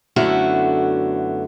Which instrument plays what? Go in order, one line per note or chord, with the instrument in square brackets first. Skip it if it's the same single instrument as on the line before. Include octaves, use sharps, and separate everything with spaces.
[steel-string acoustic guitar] F#2 D3 A3 B3 E4 F#4